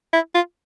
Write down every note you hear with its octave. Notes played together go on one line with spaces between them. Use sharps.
E4
F4